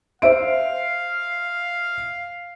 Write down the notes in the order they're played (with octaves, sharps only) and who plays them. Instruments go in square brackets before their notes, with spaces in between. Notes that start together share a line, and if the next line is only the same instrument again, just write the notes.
[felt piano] C5 E5 D7 [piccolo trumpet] F5